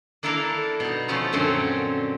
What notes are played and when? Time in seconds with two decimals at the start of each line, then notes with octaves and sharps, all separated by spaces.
0.23 A#3 D4 E4 A4 A#4 F5
0.80 B2 D#4
1.08 F3 A3 C#4 F4
1.33 F#2 A#2 D3 C4 C#4